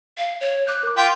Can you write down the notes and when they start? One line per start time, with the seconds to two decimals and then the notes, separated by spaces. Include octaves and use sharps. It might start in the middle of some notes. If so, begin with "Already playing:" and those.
0.18 F5
0.41 C#5
0.67 D6 F#6 G6
0.83 A#4 D6
0.97 F4 G5 C6 B6